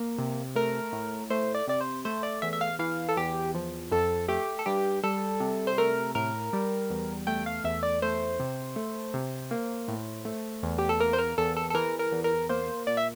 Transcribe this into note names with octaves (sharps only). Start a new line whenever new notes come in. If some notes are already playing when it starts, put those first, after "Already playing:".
Already playing: A#3
C3
A3 A#4
A2
A3 C5
D5
C3 D5
C5
A3 C5
D5
E2 E5
E5
F5
E3 F5
A4
E2 G4
F3
F2 A4
A3 G4
A4
G2 G4
G3 A4
C3
C5
A3 A#4
A2 A#4
G3
E2
A3 G5
F5
E2 E5
D5
A3 C5
C3
A3
C3
A#3
A2
A3
E2
G4
A4
A#3 A#4
C5
A#4
E2 A4
A4
A4
E3 A#4
A#4
E2
A#4
A#3 C5
A#2 D5
E5